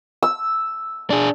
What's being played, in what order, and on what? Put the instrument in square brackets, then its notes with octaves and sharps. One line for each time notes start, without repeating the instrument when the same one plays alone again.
[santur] E6
[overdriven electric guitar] D4 G#4